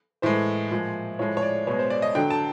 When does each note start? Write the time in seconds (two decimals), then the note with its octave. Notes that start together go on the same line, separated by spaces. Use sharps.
0.22 A2 E3 G#3 C5
0.71 A#2 F3 G#3
1.19 A2 F3 G#3 C#5
1.37 C#5
1.42 D5
1.67 B2 G#3 C#5
1.79 C5
1.90 D5
2.02 D#5
2.15 D3 F#3 G5
2.30 A5